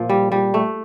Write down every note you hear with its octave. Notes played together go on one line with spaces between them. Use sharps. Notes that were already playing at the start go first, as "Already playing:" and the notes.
Already playing: A#2 F3
G3
G3
A3